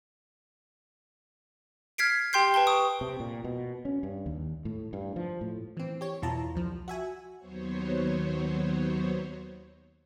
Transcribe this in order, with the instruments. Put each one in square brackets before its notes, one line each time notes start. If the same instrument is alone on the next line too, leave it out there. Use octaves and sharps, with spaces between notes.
[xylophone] F6 G#6 B6 C7 D7
G4 G5 C6 G6 C7
B4 G5 A5 G7
C#6 D#6 D7
[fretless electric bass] C3
A#2
B2
C#4
G2
D#2
A2
G2
F3
A2
[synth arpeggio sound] E3 C4
G4 C#5
E2 B2 E4 F4 A5 A#5
C2 F3
F#4 E5 G#5
[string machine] D#2 F#3 B3 C5 C#5